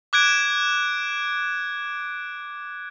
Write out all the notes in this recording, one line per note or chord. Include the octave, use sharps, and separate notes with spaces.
D6 F#6 G#6 D7